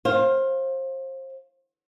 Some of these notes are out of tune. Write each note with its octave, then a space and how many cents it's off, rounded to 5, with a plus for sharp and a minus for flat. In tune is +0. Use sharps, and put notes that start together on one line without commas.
C5 +30 F5 +0